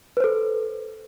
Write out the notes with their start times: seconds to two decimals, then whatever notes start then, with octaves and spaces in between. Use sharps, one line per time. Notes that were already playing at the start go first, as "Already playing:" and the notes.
0.17 B4
0.20 C5
0.24 A4